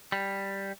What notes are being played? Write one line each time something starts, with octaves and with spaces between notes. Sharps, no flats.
G3